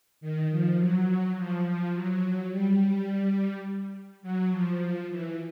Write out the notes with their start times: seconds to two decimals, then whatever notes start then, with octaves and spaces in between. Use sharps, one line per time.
0.21 D#3
0.50 F3
0.78 F#3
1.36 F3
1.65 F3
1.93 F#3
2.51 G3
4.22 F#3
4.51 F3
5.09 E3